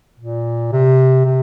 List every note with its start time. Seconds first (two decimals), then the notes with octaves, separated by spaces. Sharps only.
0.20 A#2
0.72 C3
1.26 C3